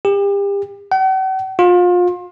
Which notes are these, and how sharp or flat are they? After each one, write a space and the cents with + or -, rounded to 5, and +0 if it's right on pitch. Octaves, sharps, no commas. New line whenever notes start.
G4 +35
F#5 +45
F4 +30